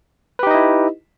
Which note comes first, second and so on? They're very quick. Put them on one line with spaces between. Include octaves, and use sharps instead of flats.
B4 G4 D#4 D#5 E4